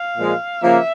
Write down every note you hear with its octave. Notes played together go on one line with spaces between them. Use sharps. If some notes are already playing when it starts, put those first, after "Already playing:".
Already playing: F5
A#2 F3 G#3
C#3 F3 A#3 E5